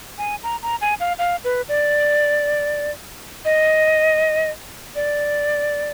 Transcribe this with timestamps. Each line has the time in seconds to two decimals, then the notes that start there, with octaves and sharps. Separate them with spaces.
0.18 G#5
0.43 A#5
0.63 A#5
0.81 G#5
1.00 F5
1.19 F5
1.44 B4
1.69 D5
3.45 D#5
4.95 D5